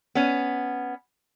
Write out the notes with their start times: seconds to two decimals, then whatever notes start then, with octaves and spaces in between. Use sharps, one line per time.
0.15 B3 C#4